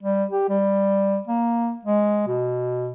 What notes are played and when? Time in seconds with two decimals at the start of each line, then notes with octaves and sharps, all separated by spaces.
0.03 G3
0.31 G4
0.49 G3
1.27 A#3
1.85 G#3
2.27 B2